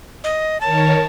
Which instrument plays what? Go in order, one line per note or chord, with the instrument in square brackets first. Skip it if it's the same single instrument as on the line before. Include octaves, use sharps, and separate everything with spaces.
[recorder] D#5
[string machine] D#3 A#4 C#5 [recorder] A5